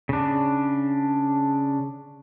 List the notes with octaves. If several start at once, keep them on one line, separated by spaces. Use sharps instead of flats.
C#3 D4